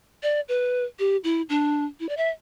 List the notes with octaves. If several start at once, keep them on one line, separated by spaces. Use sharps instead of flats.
D5
B4
G4
E4
D4
E4
D5
E5